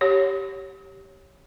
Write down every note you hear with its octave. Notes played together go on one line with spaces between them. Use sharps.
G4 C#5